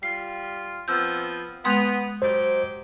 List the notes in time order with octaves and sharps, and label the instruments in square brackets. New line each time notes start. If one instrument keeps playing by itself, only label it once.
[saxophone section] G3 F4 [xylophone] C7
[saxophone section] F3 B3 C4 [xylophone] E6 G6
[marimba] G#3 F#5 C6 [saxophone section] B3 [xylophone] D#6 F7
[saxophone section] F#3 G4 D#5 [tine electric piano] C5